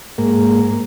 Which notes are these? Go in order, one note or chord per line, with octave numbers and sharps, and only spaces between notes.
G#2 A#3